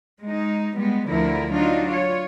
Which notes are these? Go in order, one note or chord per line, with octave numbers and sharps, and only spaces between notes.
G#3 D#4
G3 G#3 B3
D2 D3 F3 E4 A#4
F#3 D4 D#4 F4
F4 C#5